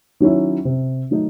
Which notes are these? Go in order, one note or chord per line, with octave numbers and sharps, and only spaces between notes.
D#3 F#3 C#4 E4
C3
D#3 F#3 A3 D#4